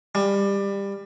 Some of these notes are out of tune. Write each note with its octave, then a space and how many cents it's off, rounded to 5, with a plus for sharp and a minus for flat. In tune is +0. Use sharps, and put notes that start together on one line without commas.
G3 +20